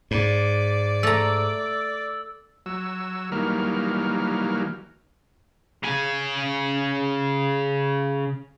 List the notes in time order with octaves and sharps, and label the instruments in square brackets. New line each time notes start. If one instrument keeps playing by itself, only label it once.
[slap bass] G#2 [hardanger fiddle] D5
[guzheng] A3 A#5 [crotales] E6 A6
[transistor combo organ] F#3 E6
D#3 E3 F#3 G3 A#3 F6
[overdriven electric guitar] C#3 G#5